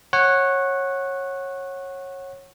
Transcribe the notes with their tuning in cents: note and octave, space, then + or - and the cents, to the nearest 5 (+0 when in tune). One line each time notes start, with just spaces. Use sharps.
C#5 -20 F#5 +0